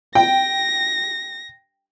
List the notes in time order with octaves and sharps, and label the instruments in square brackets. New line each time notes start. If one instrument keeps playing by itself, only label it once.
[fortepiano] G5 [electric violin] A#6